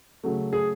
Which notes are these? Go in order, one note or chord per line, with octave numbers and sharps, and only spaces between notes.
C#3 F#3 A3
G#4